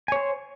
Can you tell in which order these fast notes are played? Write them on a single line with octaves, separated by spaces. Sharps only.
G#5 C#5 C5